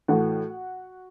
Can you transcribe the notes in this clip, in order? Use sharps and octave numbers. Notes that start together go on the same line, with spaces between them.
A2 E3 A3 F#4 F#5